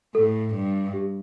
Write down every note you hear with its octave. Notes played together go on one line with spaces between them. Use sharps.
A2 A4
G2
G4